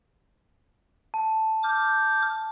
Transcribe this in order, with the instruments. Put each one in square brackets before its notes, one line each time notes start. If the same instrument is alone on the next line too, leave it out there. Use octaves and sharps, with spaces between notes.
[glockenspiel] A5
[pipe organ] D6 F6 G6